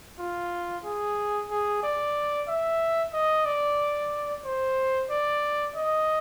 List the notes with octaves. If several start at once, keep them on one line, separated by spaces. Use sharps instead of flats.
F4
G#4
G#4
D5
E5
D#5
D5
C5
D5
D#5